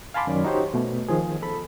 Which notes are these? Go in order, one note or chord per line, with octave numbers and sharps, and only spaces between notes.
F5 G#5 A5 B5 C6 D6
F#2 D#3 C#4 D5
D#4 F#4 G4 C5 C#5
B2 A3
D#3 F3 G#4
A4 B5